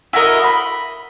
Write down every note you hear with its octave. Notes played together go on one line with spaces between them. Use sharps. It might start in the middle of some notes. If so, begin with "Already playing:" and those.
E4 F#4 A#4 D#5
B5